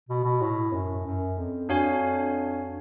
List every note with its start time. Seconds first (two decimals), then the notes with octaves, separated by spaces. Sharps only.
0.09 B2
0.25 B2
0.41 A2
0.73 F#2
1.05 F#2
1.38 F2
1.69 F2 D4 F#4 C#5 F5 G#5